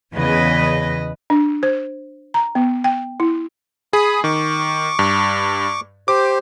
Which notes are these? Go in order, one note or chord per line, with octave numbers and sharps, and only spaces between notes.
E2 C#3 B4 D#5
D4
C5
A#5
B3
G5
E4
G#4 B5 D#6
D#3 C#6 D6
G2
G4 C5 D6